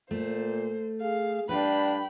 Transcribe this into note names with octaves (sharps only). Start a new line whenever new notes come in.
A#2 A3 C5
G#4 F5
G2 D4 B4 D5 F5 G5 B5